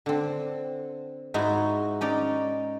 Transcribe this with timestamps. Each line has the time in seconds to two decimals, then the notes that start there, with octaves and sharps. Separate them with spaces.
0.06 D3 C4
1.34 G#2 D#4 E4 F#4
2.01 C#4 D#4 D5